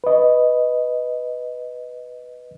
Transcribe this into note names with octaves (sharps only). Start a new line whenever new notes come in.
B4 D#5